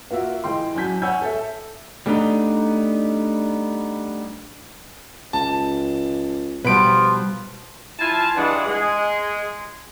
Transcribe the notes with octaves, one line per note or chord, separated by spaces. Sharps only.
A#3 F4 F#4 E5
E3 G#3 G5 C6
F#3 C#4 G#5 A5 G6 B6
C#5 F#5 G#5 E6 G6
A4 E5
G3 A3 B3 D4 D#4
C#2 A5
B2 F3 G3 B4 D7
F3 E4 G#5 A5
G2 E3 G#3 D4 F4 F#5
G#3 G#4